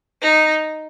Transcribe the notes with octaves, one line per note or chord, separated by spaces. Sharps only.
D#4